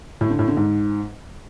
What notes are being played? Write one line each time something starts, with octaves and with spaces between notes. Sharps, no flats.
A2
D3
A2
D3
G#2